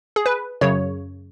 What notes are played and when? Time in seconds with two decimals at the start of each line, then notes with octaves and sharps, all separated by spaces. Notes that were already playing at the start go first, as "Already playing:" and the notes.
0.16 G#4
0.26 B4
0.61 F#2 C#3 C#5